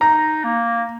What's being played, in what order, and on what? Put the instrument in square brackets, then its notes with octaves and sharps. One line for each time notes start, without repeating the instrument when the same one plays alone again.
[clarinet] D#4 [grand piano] A#5
[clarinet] A#3